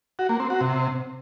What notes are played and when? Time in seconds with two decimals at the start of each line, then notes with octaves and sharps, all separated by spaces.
0.19 F#4
0.29 A#3
0.40 C4
0.50 F#4
0.61 C3